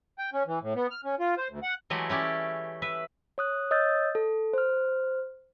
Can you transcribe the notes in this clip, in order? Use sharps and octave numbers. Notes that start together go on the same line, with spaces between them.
G5
C#4
E3
A2
B3
F6
C#4
F4
C5
D2
F#5
E3 F#3 G#3 A3 G4
C#4 E4 G4 D5
B4 E5
C#5 D#6 F#6
C#5 D#5 D#6 E6 G6 A6
A4
C5 F6